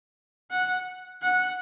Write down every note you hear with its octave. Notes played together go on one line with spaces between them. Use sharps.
F#5
F#5